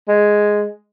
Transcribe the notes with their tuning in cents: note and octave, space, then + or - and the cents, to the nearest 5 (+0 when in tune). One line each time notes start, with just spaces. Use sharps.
G#3 +0